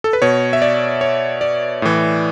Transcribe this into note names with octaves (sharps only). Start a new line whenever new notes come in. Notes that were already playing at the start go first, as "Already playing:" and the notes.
A4
B4
B2 C#5
E5
D5
C#5
D5
A2 E3